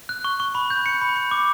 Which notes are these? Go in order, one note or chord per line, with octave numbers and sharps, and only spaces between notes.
F#6
C#6
C#6
B5
G6
C#7
B5
C#7
D6